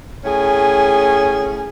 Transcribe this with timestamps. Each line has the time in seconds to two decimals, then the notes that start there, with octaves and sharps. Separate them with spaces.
0.25 A2 C#4 G#4